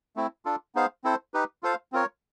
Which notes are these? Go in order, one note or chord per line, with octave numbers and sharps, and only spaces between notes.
A3 C4 E4
D4 F4 A4
B3 D#4 G#4 C5 F5
C4 E4 A4 C5
D#4 G4 B4
F4 A4 C5 F5
C4 F4 A#4 C#5